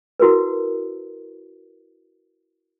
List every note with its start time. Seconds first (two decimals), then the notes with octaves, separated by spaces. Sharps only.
0.20 E4 F#4 A#4 B4